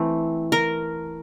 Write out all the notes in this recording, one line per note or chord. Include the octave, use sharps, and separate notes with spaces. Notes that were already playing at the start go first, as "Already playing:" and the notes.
Already playing: E3 A3 C4
A#4